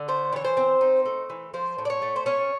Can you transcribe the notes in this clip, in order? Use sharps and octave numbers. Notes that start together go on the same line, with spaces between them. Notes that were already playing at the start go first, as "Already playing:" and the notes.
Already playing: D3
A3 C5
E3 C#5
C5
C4
D#4
A3
E3
F3 C5
A2
D5
C#5
A3
C5
C#4 C#5